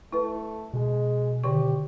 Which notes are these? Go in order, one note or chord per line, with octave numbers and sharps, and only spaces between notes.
A3 E4 B4
B2 G#3
D3 D#3 G4 C#6